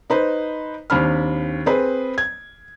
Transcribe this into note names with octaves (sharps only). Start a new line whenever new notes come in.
D#4 B4 C5
D#2 C4 D4 B5 F6
C4 G#4 B4
G#6